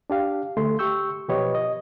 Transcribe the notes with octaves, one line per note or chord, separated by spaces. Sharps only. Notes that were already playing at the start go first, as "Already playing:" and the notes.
D4 G4 F5
D3 A3 C6
G4 C#6 E6 G6
B2 F3 G4 B4 C#5 D#5
D#5